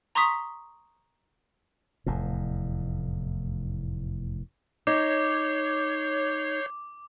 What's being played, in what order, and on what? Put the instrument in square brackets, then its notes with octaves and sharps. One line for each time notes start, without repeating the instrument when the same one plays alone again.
[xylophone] A#5 C6 C#6 D#6 B6
[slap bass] F1 E2 A2
[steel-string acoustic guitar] D#4 [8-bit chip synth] C#5 G6 C7 [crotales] D6